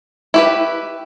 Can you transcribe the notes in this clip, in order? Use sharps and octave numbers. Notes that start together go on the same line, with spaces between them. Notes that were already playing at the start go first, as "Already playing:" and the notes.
E4 G4 B4